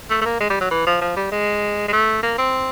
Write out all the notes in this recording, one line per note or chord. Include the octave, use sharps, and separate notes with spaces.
A3
A3
A#3
G#3
G3
F#3
E3
F3
F3
G3
G#3
G#3
A3
A#3
C4